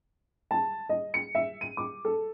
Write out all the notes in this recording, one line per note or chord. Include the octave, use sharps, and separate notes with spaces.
A5
D#5
C#7
E5
D#7
D6
A4